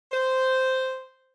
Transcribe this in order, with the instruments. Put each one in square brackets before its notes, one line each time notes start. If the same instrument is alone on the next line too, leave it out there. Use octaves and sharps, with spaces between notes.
[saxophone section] C5